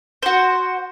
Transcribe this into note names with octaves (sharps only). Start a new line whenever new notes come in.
F#4 C5